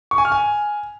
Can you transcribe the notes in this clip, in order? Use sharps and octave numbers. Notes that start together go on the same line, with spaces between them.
C#6
G#5
F6
G#5